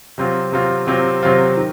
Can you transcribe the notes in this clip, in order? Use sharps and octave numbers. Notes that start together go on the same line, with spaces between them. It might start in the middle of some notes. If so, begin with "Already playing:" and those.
C3 F#3 C4 F4
C3 F#3 C4 F4
C3 F#3 C4 F4
C3 F#3 C4 F4
D#3